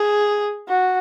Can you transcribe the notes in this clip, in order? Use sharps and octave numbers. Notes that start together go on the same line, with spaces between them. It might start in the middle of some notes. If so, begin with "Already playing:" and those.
Already playing: G#4
F#4